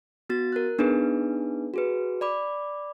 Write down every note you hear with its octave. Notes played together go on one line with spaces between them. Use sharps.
B3 F#4 A6
A#4 F#6
B3 D4 D#4 G#4 B4
F#4 G#4 B4
D5 B5 D6